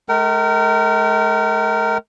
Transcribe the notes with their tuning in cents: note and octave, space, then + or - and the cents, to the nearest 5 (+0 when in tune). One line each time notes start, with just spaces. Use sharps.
G#3 +45 A#4 -15 G5 -45